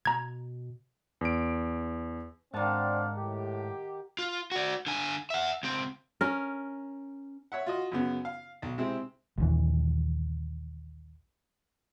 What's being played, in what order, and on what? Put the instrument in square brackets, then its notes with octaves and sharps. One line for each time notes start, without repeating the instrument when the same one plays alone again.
[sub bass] B2 [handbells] A#5 G#6
[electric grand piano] E2 D7
[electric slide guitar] G#2 A5 [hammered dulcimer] D#3 F#5 [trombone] C4 [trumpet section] D4 D5 F5
[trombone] A2 [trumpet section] G4
[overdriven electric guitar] F4
F#4 D5
D3 G#5
E5 F#5
C#2 C4
[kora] C#4 A#4
[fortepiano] C#5 E5 F#5
F4 F#4 D#5
F#2 C#3 B3
F5
B1
C3 G#3 C4 E4
[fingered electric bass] A#1 D#2 E3